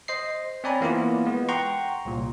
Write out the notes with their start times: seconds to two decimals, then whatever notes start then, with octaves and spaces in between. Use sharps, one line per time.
0.08 C5 D#5 C7
0.64 C4 C#5 D5 G#5 A#5 B5
0.81 E3 A#3 B3 E4 F4
1.25 G#3 B3
1.49 F#5 G5 A#5 C6 C#6
2.05 C2 A#2